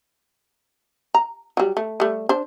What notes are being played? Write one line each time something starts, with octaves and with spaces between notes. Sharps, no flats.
A#5
F#3 G3
A3
G3 A3
D4 C5